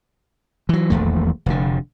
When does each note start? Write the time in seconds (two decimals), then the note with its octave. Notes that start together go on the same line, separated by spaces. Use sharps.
0.69 E3 F#3
0.90 D#1 A#1 E2 A3
1.46 F1 D3